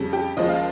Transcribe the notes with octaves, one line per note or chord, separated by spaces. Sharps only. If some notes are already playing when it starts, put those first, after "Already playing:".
Already playing: F2 C#3 G3
G4
D#2 C#3 F3 G#3 D#5
F5